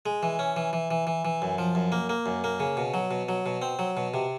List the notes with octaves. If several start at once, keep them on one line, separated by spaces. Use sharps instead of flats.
G#3
E3
C#4
E3
E3
E3
E3
E3
F#2
F3
F#2
A#3
A#3
F#2
A#3
C#3
B2
F#3
B2
F#3
B2
C4
F#3
B2
C3